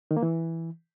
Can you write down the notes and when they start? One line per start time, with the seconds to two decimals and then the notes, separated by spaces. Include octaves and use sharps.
0.11 D#3
0.17 A#3
0.23 E3